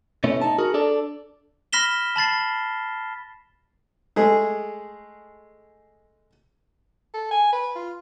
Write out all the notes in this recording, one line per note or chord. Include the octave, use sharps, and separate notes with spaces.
B2 A3 C#4 E4
D#4 A5
F#4 G#4 A#4
D4 A4 D5
B5 F6 A#6 B6 E7 G7
A5 B5 A6 C7
G#3 A3 G#4
A4
G#5
B4
F4